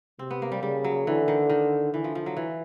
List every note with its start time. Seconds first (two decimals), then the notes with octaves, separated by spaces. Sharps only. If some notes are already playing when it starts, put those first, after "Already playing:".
0.19 C3 C4
0.31 B3
0.42 A#3
0.52 G3
0.63 C#3 G3
0.84 F#3
1.07 D3 E3
1.28 D#3
1.50 D#3
1.93 D3 E3
2.04 F3
2.15 F3
2.26 F#3
2.37 E3